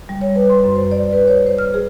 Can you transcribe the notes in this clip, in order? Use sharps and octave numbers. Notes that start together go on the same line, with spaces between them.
G3
C#5
B4
C6
F#2
C5
D5
B4
C#5
C5
F6
G#4